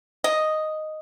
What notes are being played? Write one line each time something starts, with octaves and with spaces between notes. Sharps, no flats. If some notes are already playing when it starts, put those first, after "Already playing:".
D#5